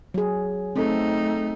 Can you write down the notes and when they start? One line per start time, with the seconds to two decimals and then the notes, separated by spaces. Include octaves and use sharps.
0.14 F#3 G#4
0.76 A3 C4 D#4 A4